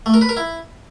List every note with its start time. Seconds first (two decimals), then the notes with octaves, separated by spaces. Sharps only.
0.06 A3
0.14 A#4
0.21 B4
0.29 A#4
0.37 E4